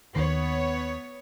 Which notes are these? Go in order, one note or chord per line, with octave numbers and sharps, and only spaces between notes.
D#2 D#3 B3 C#5